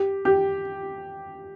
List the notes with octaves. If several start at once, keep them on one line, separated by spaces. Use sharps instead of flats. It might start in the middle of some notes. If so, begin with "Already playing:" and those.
Already playing: G4
G4